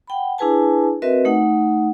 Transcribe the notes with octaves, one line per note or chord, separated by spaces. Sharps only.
F#5 G5 B5
D4 E4 G#4 B4 G#5 A5
C4 F#4 A#4 B4 D#5 E5
A3 D#4 F#5